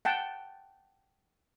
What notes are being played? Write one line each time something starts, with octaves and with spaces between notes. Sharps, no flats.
F#5 G5 A5